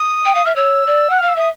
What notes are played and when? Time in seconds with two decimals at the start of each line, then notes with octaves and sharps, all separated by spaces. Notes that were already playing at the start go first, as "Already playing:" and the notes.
Already playing: D#6
0.25 G5
0.35 F5
0.46 E5 F6
0.55 C#5 E6
0.87 D5
1.10 F#5 F#6
1.18 F5 F6
1.28 E6
1.36 E5 D#6